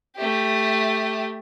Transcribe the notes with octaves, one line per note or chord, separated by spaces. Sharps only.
A3 G4